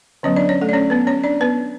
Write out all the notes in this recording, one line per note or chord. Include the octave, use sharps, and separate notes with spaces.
D3 F#3 B3 C#4 C#5
D4 D5
C#4 C#5
A3 A4
D5
C#4 C#5
B3 B4
C#4 C#5
D4 D5
B3 B4